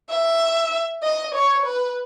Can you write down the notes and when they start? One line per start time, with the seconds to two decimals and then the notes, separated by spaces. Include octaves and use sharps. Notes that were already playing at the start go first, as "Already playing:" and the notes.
0.10 E5
1.03 D#5
1.34 C#5
1.66 B4